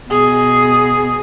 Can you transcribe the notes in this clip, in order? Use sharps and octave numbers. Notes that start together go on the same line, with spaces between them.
B2 G#4